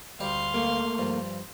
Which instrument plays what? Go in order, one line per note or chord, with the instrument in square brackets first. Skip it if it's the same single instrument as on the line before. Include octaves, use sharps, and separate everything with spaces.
[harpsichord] D2 G3 G4 [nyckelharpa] F5 C6
[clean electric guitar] A3 A#3
[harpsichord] G2 F3